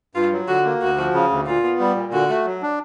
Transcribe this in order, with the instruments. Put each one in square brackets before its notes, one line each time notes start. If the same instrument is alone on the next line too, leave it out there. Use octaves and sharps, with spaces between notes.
[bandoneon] G2 [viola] F4
[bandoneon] F#3
[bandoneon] D3 [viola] F#4
[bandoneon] A#3
[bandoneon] D2 [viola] F#4
[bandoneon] F3
C#3
D2
[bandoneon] A#2 [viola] F4
[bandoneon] B3
G3
A#2
[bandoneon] D3 [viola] F#4
[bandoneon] A3
F#3
D4